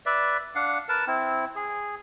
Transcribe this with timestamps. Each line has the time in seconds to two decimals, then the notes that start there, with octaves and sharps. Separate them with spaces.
0.06 B4 D5 E5
0.55 D4 F5 F#5
0.89 A#4 B4 A5
1.07 C4 E4
1.56 G#4